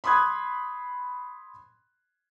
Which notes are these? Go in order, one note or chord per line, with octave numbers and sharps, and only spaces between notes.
B5 C6 D#6 F#6 G#6